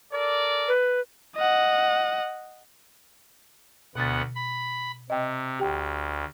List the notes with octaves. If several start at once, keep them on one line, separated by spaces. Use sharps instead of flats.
A4 A#4 D5
B4
D#5 F#5
D2 B2 B3 F#5 A6
B5
C3 D#5 G5
D2 G4 G5